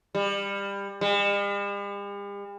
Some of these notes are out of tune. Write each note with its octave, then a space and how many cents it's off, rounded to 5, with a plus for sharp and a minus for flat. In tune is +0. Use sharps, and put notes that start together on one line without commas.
G3 +25
G3 +45